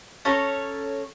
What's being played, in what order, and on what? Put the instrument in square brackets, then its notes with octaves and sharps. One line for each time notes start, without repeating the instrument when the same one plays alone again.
[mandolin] C#4 A4 C#5 A#5